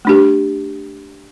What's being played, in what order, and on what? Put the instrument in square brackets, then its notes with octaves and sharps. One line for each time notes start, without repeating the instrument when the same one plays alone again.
[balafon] A3 D4 G4